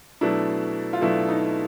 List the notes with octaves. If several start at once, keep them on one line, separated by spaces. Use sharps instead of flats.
B2 F#3 A3 D4 E4
F4
B2 F#3 A3 D4 E4
D#4